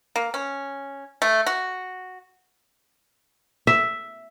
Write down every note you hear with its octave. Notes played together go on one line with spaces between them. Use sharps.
A#3
C#4
A3
F#4
E5